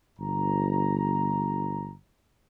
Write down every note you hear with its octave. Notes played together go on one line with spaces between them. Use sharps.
G1 A#5